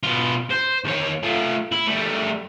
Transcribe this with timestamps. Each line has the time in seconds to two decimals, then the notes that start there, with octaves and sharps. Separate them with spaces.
0.03 B2 F4
0.50 C5
0.85 D#2 C#5
1.23 A3 F4
1.72 E4
1.87 G3 A3